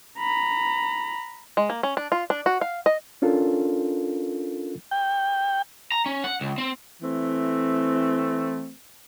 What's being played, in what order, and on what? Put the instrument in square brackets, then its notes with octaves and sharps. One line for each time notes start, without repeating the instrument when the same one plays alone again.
[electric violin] A#5 B5
[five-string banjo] G#3
A#3
C#4
D4
F4
D4
F#4
F5
D#5
[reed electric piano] C#4 D4 F4 A4 A#4
[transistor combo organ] G5
[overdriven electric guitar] A#5
C#4
F#5
C#2
C4
[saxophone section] E3 A3 C4